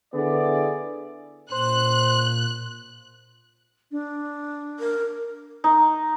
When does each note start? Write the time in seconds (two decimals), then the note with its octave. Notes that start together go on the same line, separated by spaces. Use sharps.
0.14 D3 B3 E4 G#4 D5
1.52 A#2 C5 F#6
3.91 D4
4.79 A#4
5.64 D#4